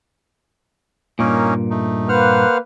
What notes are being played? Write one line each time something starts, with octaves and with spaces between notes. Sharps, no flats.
G2 A#2 A#3 C#4 D#4
A3 D#4
A#3 B4 C5 F#5 F6